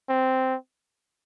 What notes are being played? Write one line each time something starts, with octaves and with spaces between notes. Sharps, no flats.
C4